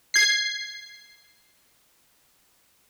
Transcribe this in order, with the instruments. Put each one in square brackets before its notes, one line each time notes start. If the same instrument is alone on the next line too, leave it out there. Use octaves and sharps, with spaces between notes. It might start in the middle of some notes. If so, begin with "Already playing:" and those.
[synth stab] G#6 C7